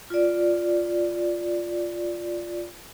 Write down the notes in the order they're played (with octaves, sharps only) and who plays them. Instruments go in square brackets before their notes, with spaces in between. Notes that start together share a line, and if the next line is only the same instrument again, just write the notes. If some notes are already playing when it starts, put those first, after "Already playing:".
[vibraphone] F4 D5